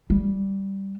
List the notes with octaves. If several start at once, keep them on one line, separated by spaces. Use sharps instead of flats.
G3